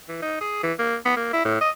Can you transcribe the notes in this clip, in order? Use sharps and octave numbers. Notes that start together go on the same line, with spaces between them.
E3
D#4
G#4
E3
A#3
B3
A#3
E4
A2
D#5